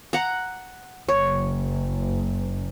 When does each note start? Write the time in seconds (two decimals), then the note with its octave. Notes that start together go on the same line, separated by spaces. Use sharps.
0.13 F#5 A#5
1.08 F#1 C#5